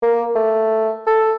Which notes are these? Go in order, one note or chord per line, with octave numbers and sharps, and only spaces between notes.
A#3
A3
A4